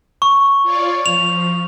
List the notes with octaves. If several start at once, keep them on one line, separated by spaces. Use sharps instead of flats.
C#6
F4 C#5 D5
F3 F7